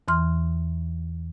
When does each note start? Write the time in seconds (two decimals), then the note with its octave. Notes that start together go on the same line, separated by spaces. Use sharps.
0.08 E2 E3 C6 F6